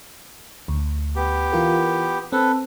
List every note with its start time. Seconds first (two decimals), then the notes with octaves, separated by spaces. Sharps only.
0.68 D2
1.16 B3 G4
1.52 E3 F4 A#4
2.32 C4 A4 B4